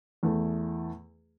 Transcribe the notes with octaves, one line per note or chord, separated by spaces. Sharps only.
E2 E3 A3